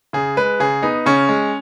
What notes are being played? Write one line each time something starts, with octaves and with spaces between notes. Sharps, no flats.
C#3 G#4
G#3 B4
C#3 G#4
B3 D#4
C#3 C#4
G#3